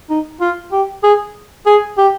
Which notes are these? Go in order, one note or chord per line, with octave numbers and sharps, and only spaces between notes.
D#4
F4
G4
G#4
G#4
G4